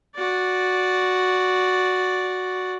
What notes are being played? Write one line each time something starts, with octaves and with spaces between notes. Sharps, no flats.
F#4 D5